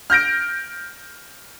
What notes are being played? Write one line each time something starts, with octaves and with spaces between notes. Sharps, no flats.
F6 G6 A#6 D7